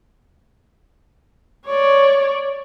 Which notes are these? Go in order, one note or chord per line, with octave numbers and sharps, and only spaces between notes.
C#5 D5